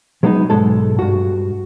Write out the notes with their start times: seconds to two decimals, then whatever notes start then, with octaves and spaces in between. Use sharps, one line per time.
0.23 F#3 G#3 B3 C#4 D#4
0.50 B1 E2 G#2 G#3 A4
0.99 G2 F#4